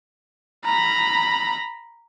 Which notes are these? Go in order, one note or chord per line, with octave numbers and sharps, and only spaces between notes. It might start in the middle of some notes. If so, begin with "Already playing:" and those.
A#5 B5